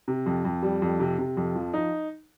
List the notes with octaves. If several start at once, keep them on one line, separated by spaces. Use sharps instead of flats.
C3
F2
F2
G3
F2
C3
C3
F2
F3
D#4